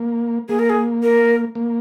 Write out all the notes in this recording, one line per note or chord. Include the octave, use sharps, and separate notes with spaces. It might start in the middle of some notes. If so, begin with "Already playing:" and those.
Already playing: A#3
A#3 G#4
A#4
G#4
A#4
A#3